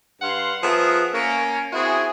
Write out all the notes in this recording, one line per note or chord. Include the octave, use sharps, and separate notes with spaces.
G2 F5 F#5 C6
F3 B3 G#4 A#4 E5
A#3 C#4
C4 E4 F#4 G#4